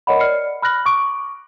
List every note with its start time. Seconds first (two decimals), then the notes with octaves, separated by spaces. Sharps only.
0.07 A#4 C#5 D#5 F#5 B5
0.20 D5 F6 C7 C#7
0.62 B5 F6 F#6 A#6 F#7
0.86 C#6 D6 D7